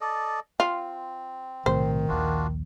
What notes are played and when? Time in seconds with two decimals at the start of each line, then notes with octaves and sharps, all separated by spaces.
0.01 A4 D5 D#5
0.60 C4 F4
1.66 B1 A2 C3 D#3 C5
2.08 A#1 D#2 D4 F4 F#4